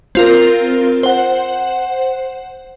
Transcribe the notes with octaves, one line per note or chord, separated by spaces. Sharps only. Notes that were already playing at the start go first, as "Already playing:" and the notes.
C4 F4 A#4
C5 F#5